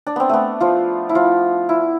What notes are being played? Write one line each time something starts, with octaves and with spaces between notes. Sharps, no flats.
D4
B3 C4
A3 B3
F3 F4
E4
F3 F4
E4